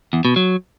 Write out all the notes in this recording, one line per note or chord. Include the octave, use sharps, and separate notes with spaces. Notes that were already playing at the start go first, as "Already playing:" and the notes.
E2
B2
F#3